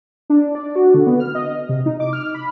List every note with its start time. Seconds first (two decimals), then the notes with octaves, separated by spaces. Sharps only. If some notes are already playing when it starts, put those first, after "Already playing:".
0.30 D4
0.55 D5
0.76 F#4
0.94 D3
1.07 B3
1.20 F6
1.35 D#5
1.69 C3
1.86 D#4
2.00 D6
2.13 F6
2.34 B5